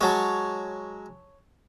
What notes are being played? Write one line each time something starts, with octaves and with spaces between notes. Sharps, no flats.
F#3 G#3 C#5 A5